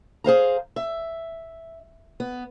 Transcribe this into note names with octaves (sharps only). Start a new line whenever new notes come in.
G#4 C5 F5 A#5
E5
B3